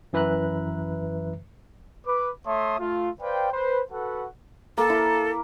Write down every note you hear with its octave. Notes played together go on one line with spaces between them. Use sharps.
F#2 E3 B4 E5 A#5 F#6
B4 D6
A3 C#5 E5 A5 C6 D#6
A3 F4
B4 C5 D5 F5 G5
B4 C5
F#4 A4 B4 F#5
A#3 A4
E4